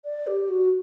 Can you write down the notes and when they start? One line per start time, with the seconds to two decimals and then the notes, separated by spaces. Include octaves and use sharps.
0.05 D5
0.27 G4
0.49 F#4